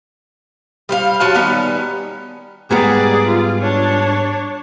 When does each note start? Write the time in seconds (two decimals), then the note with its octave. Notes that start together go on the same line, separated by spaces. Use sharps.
0.89 G3 C5 F5
1.20 F#3 F4 F#4 A5
1.34 D#3 G3 B3 C#4
2.71 G#2 G3 B3 G#4 D5
3.27 F4
3.61 D4 C#5